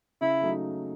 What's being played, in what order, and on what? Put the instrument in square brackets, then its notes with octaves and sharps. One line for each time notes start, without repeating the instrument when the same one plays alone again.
[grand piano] C#3 [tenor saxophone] E4
[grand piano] F#3 A3 D#4